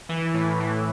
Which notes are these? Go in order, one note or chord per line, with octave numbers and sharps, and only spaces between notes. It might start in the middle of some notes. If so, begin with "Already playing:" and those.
E3
A2
E3